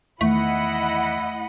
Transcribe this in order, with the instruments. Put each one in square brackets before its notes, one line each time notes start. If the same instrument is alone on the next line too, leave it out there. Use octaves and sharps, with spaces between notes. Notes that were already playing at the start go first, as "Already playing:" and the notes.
[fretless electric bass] E2 D#3 E3 [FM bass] A3 [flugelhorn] E4 [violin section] D#5 F#5 B5